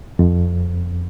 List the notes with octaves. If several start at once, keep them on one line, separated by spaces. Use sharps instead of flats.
F2